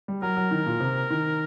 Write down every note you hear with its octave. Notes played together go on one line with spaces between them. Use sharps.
G3
F#3 A#4
F#3
D#3
A#2
C3
D#3